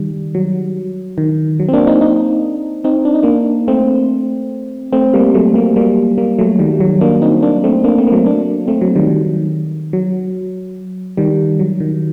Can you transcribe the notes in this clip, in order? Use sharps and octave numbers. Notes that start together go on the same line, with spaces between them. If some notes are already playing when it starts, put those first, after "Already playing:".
Already playing: D#3 G3
F#3
D#3
F#3
C4
A#3 D4
C4 D#4
C4 D#4
C4 D#4
D4
D#4
A#3 D4
A3 C4
A3 C4
G3 A#3
F#3 A3
G3 A#3
G3 A#3
G3 A#3
F#3 A3
D#3 G3
F#3
A#3 D4
C4 D#4
A#3 D4
A3 C4
A#3 D4
A3 C4
A#3
F#3 A3
A#3 D4
A3 C4
F#3
D#3 G3
D#3
F#3
D#3 G3
F#3
D#3